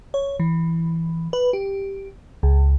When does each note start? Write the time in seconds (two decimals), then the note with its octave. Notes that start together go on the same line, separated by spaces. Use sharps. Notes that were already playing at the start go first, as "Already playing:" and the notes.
0.14 C#5
0.40 E3
1.33 B4
1.53 G4
2.43 C#2